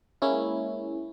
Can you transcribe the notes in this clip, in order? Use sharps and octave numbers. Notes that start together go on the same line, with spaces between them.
G#3 A#3 C#4 E4